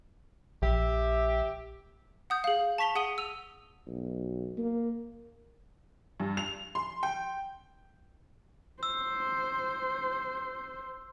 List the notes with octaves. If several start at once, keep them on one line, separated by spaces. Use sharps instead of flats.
A#1 G4 E5
F#5 D#6 G6
G#4 F5
A5 C#6 B6 F7 G7
G#4 F#5 D#6 D#7 G7
E6 D#7 F7
B1
A#3
G2
F7
C6
G5
C5 E6